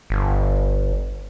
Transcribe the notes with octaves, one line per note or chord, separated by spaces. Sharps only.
G1